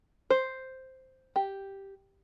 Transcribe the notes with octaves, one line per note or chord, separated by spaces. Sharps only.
C5
G4